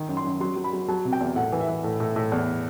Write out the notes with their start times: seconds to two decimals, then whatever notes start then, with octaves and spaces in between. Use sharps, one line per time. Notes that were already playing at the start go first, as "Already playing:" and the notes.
Already playing: D#3
0.09 F#2
0.17 C6
0.24 F#2
0.40 F#3 C6
0.56 F#3
0.64 B5
0.73 F#3
0.88 F#3 A5
1.05 C3
1.13 G5
1.21 E2
1.36 A2 F#5
1.52 E3
1.60 E5
1.68 E3
1.84 A2
2.00 A2
2.16 A2
2.32 E2